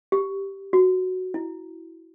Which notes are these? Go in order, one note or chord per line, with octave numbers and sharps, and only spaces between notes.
G4
F#4
E4